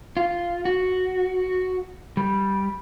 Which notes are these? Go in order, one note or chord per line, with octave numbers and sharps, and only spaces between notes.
F4
F#4
G3